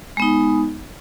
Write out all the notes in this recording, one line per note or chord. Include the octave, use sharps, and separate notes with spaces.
G#3 B3 D#4